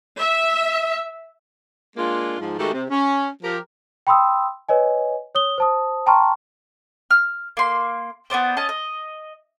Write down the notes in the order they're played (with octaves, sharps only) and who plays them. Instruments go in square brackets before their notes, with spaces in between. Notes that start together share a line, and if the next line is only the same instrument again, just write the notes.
[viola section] E5
[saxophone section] G#3 A#3 D4 F4
G#2 F3
D#3 G#3 A3 F#4 G4 A4
C3
C#4
F3 G4 A#4
[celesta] G5 B5 C6 D#6 E6
B4 C#5 D#5 G#5
C#5 D#6 G7
C5 A5 D#6
G5 A5 A#5 C6 C#6 F6
[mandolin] F6
A#3 C6
B3 C4 D4 C5
C#4 D#5 A5
D#5